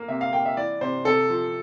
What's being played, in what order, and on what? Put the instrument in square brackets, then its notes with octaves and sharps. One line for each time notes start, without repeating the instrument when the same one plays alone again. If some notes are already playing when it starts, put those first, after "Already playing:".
Already playing: [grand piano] A#3
C3 E5
F5
A#3 G5
E5
E3 D5
C3 C5
C3 A4
F3